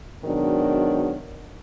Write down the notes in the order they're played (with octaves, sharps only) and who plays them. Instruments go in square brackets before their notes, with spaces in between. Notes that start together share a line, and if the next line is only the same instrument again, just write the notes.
[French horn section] G#2 B2 D#3 F#3 D4